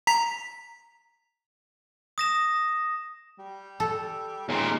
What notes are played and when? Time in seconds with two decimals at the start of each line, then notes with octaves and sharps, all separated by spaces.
0.07 A#5 B6
2.18 D#6 A#6 E7
3.39 G3
3.80 A4
4.49 D#2 A#2 G#3